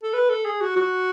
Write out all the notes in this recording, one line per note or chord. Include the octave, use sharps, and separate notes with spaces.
A4
B4
A4
G#4
F#4
F#4